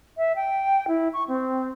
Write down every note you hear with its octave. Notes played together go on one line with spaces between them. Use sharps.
E5
G5
E4
C#6
C4